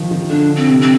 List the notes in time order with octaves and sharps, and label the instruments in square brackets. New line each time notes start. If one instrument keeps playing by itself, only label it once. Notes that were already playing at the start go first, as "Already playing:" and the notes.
Already playing: [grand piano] D#3 F3
D#3
[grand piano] D3 [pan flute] D4
[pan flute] C4
[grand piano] C3
[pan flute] C4